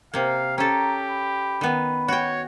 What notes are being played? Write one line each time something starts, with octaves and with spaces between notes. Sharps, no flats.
C3 A#3 F5
C#4 G4 A4 A#5
B5
D#3 B3
F#4 C#5 G5